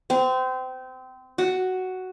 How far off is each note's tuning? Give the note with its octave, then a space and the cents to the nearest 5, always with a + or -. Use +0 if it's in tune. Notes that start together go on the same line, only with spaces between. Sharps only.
C4 -25
F#4 +5